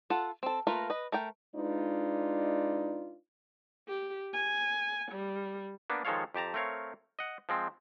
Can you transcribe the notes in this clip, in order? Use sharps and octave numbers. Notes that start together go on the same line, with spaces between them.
F4 A4 F#5
C4 A4
A3 A#3 F4 A#4 B4
B4 D#5
A3 A#4 G5
G#3 D4 D#4 F4 B4 D5
G4
G#5
G3
A#3 B3 D4
D#3 F3 G#3 A4 C#5 F5
F2 G4 A5 A#5
A3 C4 A#4 C#5 F5
D#5 F#5
F3 G#3 C4